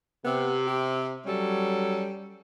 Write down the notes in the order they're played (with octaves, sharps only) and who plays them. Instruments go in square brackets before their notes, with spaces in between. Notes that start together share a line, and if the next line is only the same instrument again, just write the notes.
[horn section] C3 [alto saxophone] B3
[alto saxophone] G4
[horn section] F#3 C#4 A4 [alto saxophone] G3